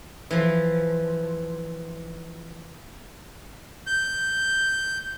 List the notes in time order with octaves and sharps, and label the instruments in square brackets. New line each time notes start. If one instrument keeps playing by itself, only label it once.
[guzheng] E3 F3
[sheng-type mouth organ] G6